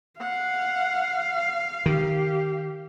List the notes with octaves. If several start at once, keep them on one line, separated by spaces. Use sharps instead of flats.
F5 F#5
D#3 G4